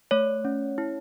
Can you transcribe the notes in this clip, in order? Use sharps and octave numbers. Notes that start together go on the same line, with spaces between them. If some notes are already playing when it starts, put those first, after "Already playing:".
A3 C#5
C#4
E4